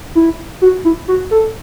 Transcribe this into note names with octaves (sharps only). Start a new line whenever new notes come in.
E4
F#4
E4
F#4
A4